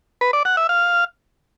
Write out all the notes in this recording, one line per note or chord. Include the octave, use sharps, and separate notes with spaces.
B4
D5
F#5
E5
F5